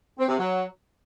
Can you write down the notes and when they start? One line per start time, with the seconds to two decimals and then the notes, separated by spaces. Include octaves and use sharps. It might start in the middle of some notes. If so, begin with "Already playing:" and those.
0.19 C4
0.29 C3
0.38 F#3